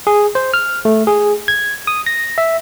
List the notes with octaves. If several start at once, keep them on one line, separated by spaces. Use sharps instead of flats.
G#4
C5
F6
A3
G#4
G#6
D#6
A#6
E5